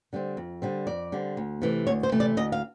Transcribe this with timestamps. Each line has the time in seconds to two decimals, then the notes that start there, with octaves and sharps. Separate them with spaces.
0.13 D3 G3 C4
0.37 F2
0.62 D3 G3 C4
0.87 F2 D5
1.12 D3 G3 C4
1.37 D2
1.62 C3 E3 A3
1.87 D2 C#5
2.03 C5
2.12 C3 E3 A3
2.20 D5
2.37 D2 D#5
2.52 F5